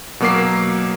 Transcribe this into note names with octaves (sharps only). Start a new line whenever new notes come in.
B2 F#3 A#3 D6 C7